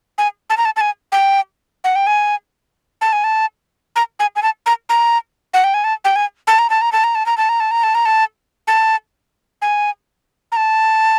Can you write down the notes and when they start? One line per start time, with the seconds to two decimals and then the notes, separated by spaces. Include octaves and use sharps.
0.18 G#5
0.50 A5
0.57 A#5
0.65 A5
0.76 A5
0.81 G#5
1.12 G5
1.84 F#5
1.96 G5
2.07 G#5
3.01 A5
3.13 G#5
3.24 A5
3.96 A#5
4.20 G#5
4.36 G#5
4.43 A5
4.66 A#5
4.89 A#5
5.54 F#5
5.64 G5
5.74 G#5
5.84 A5
6.05 G5
6.16 G#5
6.47 A5
6.59 A#5
6.70 A5
6.81 A#5
6.92 A5
7.04 A#5
7.15 A5
7.26 A#5
7.38 A5
7.49 A#5
7.60 A5
7.71 A#5
7.83 A5
7.95 A#5
8.06 A5
8.67 A5
9.62 G#5
10.52 A#5
10.57 A5